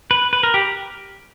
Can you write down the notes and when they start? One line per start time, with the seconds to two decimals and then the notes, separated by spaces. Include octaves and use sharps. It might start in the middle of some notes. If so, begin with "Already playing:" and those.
0.11 B4
0.33 B4
0.43 A#4
0.54 G4